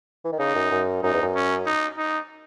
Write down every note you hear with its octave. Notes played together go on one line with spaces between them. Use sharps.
E3
D#3
C#3 D#4
F#2
F#2
F#2 D#4
E2
F#2
C#4
D#4
D#4